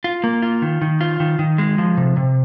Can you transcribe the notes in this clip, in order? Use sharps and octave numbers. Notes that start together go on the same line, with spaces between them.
F4
A#3
F4
D#3
D#3
F4
D#3
D#3
G#3
F3
C3
C3